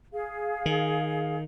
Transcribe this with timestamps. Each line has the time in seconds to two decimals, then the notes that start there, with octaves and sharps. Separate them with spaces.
0.13 G#4 F5
0.66 D#3